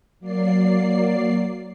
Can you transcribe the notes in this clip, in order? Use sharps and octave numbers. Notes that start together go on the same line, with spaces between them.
F#3 A#3 D5 C7